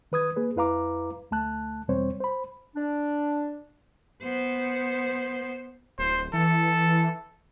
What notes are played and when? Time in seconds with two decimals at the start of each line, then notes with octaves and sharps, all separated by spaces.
0.12 D#3 B4 D#6 G#6
0.36 A#3 G#4 B4
0.56 F2 E4 B4 F5 A#5 D6
1.31 D2 A3 A5 F#6
1.88 E2 B2 G3 C4 C5 C#5
2.20 C5 B5
2.75 D4
4.23 B3 C5
5.99 D1 C5
6.33 E3 A4